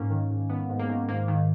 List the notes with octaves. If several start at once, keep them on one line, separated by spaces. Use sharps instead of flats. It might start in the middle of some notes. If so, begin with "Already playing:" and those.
Already playing: G#2 A#3 C#4
D#3
G#2
D#3 B3
G#2
A#3
D#3
G#2 A#3
D#3